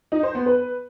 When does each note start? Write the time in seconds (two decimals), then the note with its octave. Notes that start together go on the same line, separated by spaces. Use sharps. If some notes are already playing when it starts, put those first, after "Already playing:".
0.12 D#4
0.23 C5
0.35 B3
0.46 B4